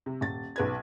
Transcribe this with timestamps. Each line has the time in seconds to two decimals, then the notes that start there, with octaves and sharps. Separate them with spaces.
0.06 C3
0.21 D#1 A6
0.56 B1 B4 G#6